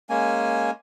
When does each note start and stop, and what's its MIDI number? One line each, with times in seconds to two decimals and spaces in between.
0.10 0.71 56
0.10 0.71 58
0.10 0.71 61
0.10 0.71 80